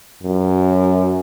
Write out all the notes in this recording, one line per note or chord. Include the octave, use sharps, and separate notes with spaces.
F#2